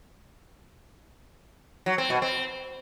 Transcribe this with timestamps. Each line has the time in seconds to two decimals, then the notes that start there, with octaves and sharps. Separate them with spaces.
1.86 F#3
1.98 C4
2.10 B2
2.22 C4